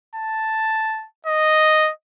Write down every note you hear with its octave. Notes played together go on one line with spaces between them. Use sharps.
A5
D#5